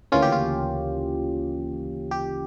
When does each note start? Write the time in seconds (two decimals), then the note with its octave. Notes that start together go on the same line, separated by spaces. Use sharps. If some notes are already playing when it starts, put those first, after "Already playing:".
0.12 D2 C#3 E3 A#3 C#4 F4
0.22 G4
0.32 F4
2.11 G4